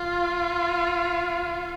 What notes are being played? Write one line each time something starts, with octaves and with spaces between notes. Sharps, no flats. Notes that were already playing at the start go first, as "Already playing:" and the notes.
Already playing: F4